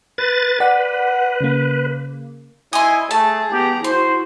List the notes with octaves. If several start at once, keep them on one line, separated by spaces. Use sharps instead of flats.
B4 A6
B4 D5 F#5 B6
C#3 A#3
E4 D#5 G#5 C6
A3 G#4 A5
B3 G4 A#5
E4 F#4 C5 C6